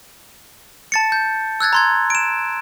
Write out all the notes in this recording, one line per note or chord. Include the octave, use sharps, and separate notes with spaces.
A5 A6 C#7
G6
E6 F#6 G#6 A6
A#5 C6 G#6
D7 E7